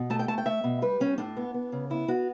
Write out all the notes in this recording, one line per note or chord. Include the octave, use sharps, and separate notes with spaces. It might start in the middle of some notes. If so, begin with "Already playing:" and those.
Already playing: B2
A3 A5
G5
A3 A5
G5
A3 E5
B2
G3 B4
G3 C#4
A2 D4
B3
B3
C#3
B3 E4
B3 F#4